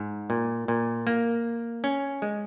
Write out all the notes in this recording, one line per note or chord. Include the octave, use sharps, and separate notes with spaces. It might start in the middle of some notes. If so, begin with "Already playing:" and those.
Already playing: G#2
A#2
A#2
A#3
C#4
G#3